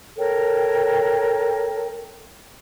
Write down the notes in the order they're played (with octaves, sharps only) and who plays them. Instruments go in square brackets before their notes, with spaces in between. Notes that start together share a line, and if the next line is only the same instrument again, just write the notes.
[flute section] A4 A#4 C#5 G5